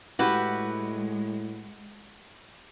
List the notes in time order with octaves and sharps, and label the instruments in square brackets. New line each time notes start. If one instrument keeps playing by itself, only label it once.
[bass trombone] A2 [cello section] G#3 [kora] E4 G4 [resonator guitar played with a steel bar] F#4 B4